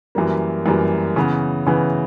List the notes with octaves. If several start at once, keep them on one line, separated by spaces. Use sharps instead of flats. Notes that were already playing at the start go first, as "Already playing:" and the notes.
F#2 E3 G3 A#3
F#2 E3 G3 A#3
C#3 E3 B3
C#3 E3 B3